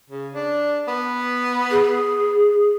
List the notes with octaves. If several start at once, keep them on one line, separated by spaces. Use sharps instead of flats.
C#3
D4
B3
G#4